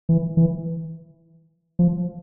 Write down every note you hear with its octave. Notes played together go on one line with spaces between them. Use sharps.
E3
E3
F3